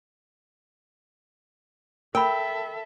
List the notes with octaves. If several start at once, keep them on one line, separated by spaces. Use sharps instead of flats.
A4 A#4 E5 G5 B5